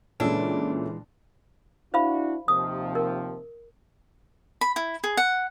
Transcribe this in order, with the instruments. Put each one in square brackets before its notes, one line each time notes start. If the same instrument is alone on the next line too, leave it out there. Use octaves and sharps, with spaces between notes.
[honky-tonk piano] A#2 C#3 [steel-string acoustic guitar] E3 G#3 [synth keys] C#4 E4 A4 [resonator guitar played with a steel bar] D4
[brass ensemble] D4 E4 F#4 [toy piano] C5 F5 B5
[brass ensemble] D#2 C3 F3 [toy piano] D#6
[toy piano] A#4
[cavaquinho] B5
E4
G#4
F#5